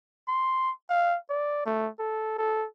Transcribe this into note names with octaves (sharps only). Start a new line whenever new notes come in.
C6
F5
D5
A3
A4
A4